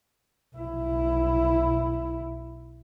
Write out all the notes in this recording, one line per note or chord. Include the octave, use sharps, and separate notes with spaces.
B1 E4